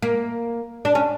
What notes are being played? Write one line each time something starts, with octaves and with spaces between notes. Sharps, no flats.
A#3
D4
C#4